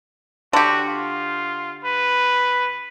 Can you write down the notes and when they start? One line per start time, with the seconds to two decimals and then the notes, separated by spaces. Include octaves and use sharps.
0.53 D3 F#4 G4
0.87 F4
1.85 B4